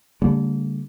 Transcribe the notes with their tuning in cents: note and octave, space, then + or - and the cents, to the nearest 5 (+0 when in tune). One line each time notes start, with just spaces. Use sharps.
D3 -30 G3 +15 A#3 -40